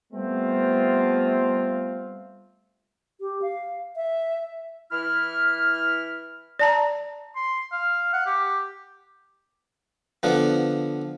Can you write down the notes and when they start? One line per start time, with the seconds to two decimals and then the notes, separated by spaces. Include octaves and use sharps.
0.13 G3 A3 B3 C4 F4
3.21 G4
3.42 F5
3.96 E5
4.92 E3 E4 F6
6.59 D5 A5 A#5
7.36 C6
7.72 F5
8.14 F#5
8.26 G4
10.23 D3 F3 B3